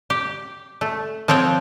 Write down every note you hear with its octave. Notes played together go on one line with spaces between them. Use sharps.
G4
A3
F3 C4 C#5 F#5 G5